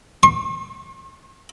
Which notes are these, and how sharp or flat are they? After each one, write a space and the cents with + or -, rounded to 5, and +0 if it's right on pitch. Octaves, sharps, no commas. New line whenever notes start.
C6 +45